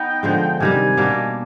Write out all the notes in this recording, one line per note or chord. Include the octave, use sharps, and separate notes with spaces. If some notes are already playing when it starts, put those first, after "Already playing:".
Already playing: B3 D#4 G5
D3 F3 G#3
C3 D#3 G3 G#5
B2 G3 A#3 D4